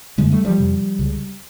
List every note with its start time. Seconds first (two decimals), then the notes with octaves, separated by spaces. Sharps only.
0.18 F#2 D3 G#3 A#3
0.32 G3 A3
0.45 F3 G3
0.58 F2 C3
0.99 C#2 C#3